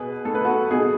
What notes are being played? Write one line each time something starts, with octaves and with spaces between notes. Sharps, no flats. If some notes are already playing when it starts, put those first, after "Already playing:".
Already playing: B2 G#4 B4
A3 A4
B4
F#4 A4
B2 G#4